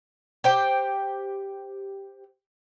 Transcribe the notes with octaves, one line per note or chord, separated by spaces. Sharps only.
G4 C5 G5